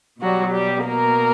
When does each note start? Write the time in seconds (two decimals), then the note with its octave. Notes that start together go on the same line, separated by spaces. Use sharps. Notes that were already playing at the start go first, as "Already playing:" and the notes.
0.21 B2 F#3 G3 F#4
0.54 G3 G4
0.86 A#3 A#4